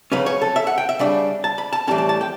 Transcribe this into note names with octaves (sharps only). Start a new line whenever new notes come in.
C#3 F#3 C#4 B4
C#5
A4
E5
F#5
G5
E5
C#3 G3 D4
A5
B5
A5
A2 E3 G3 C#4 A5
A5
A5
G5